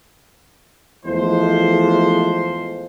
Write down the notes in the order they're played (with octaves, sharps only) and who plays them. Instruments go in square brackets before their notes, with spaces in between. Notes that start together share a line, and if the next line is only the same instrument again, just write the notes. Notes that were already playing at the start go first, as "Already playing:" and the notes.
[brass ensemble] E2 F3 G#3 A3 C5